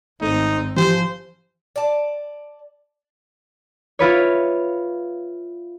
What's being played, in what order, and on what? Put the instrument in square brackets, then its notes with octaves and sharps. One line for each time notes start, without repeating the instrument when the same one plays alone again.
[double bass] G#1 C4 [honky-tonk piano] A3 [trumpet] D#4
[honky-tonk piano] E3 G4 [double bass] F3 [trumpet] C5
[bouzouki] D5 A5
[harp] E4 F4 B4 C#5